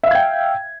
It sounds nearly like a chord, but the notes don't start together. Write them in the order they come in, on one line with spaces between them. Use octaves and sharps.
E5 F5 G#6 G5